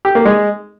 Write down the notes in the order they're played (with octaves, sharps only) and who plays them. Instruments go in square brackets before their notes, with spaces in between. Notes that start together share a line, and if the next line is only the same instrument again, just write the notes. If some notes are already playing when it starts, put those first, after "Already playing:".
[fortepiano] G4
A#3
G#3